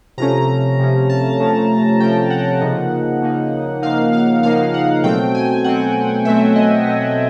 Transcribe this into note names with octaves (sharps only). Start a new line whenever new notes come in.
C3 F3 A3 C#4 A#5
C3 F3 A3 C#4
A5
C3 F3 A3 C#4
C3 F3 A3 C#4 G5
F#5
C#3 F3 A#3 D#4
C#3 F3 A#3 D#4
C#3 F3 A#3 D#4 F5
F5
C#3 F3 A#3 D#4 F5
F#5
B2 F#3 A3 C4 G5
G#5
B2 F#3 A3 C4 F#5
B2 F#3 A3 C4 E5
D#5
B2 F#3 A3 C4 D#5